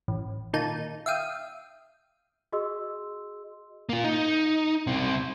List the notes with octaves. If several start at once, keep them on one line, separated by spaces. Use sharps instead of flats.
A1
A#2 D#3 D#4 A5 D#7
E5 F5 G5 D#6
F#4 G#4 D#5 C6 E6
A#3 F4
D#4
C2 C4